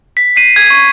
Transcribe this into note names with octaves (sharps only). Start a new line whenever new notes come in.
B6
B6 C7 D#7
G#6
C#6